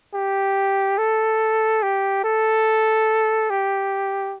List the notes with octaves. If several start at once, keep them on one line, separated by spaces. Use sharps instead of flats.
G4
A4
G4
A4
G4